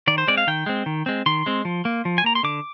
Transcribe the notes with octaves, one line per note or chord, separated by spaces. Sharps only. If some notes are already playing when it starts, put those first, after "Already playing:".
D#3 D5
C5
G#3 C4 D5
F5
D#3 G5
G#3 C4
D#3
G#3 C4
D#3 C6
G#3 C4
F3
A#3
F3
G#5
A#3 A#5
C6
D3 D6